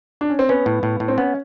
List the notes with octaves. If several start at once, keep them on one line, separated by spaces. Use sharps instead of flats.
D4
C#4
C4
B3 C#4
A2
A2
A2
C4
B3 C#4